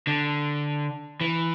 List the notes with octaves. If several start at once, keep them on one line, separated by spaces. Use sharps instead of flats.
D3
E3